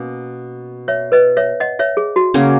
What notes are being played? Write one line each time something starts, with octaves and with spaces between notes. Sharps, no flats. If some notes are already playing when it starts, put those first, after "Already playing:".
Already playing: B2 A#3 C#4
C#5 E5
B4 D#5
C#5 E5
D#5 F#5
C#5 E5
G#4
F#4
C#3 F#3 A#3 C#4